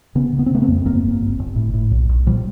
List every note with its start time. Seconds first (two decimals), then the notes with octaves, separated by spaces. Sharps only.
0.15 C#3 B3 C#4
0.33 C#3
0.39 B3
0.46 C4
0.51 C#3 A3 B3
0.62 A#3 C4
0.68 F2
0.85 G1 A#3 C4
1.03 G1
1.21 G1
1.39 G1
1.56 A2
1.74 A2
1.91 B1
2.09 B1
2.26 A#2 F3 G3